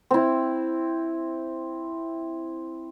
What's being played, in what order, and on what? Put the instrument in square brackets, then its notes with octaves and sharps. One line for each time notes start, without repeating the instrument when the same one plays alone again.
[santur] C4 E4